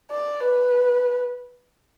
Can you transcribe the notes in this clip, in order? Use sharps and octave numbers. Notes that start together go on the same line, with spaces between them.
D5
B4